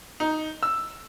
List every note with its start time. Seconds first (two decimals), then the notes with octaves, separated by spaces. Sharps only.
0.20 D#4
0.63 E6